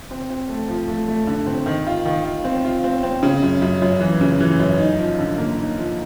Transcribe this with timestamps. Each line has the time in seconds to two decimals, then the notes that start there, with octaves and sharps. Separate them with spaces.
0.11 C4
0.30 C4
0.49 A3
0.68 F3
0.88 A3
1.08 A3
1.27 D3
1.46 C4
1.66 D#3
1.87 F4
2.06 D#3
2.25 F4
2.44 C4
2.65 F4
2.84 C4
3.03 C4
3.23 C#3
3.42 F#2
3.62 F#2
3.82 F#2
4.01 E3
4.21 C#3
4.40 E3
4.60 F#2
4.79 D#4
4.98 F3
5.19 D3
5.38 A#3
5.58 D#4
5.77 F3